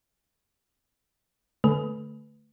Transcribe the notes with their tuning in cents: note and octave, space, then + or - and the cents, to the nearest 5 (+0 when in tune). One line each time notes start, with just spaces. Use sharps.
D3 +0 A3 +0 B4 +5